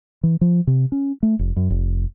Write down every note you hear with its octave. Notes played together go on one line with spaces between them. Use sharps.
E3
F3
C3
C#4
A3
F1
F#2
F1